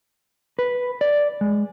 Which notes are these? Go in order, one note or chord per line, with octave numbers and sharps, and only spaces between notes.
B4
D5
G#3